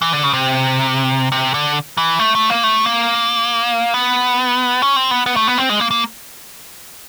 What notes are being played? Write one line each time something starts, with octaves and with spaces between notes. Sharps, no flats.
E3
D3
C#3
C3
C3
D3
E3
A3
A3
A#3
A3
A#3
B3
C#4
C4
B3
B3
A3
B3
C4
G#3
A#3
A#3